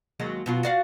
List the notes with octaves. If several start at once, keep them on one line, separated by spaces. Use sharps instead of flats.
D#2 F#3 G#3
B2 F#3 F4
F#4 D5 F5